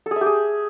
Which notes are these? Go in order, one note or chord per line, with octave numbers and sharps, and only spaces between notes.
A4
G#4
E5
G4
G#4